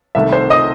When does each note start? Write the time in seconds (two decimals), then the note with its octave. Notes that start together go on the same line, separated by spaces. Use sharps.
0.15 C2 C3 D#3 A3 E5
0.33 C5 C6
0.50 D#5 D#6